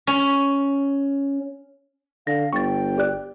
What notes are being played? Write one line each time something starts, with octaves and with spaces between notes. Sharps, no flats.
C#4
D3 F5 A#6
G1 G5 C#6 A6
G4 D5 F#6